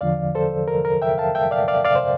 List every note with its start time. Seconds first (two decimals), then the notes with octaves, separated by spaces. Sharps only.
0.01 E2 D3 F3 D5 F5
0.35 A4 C5
0.68 A#4
0.85 A#4
1.02 E5 G5
1.18 F5 A5
1.35 E5 G5
1.51 D5 F5
1.68 D5 F5
1.85 D5 F5
1.96 C5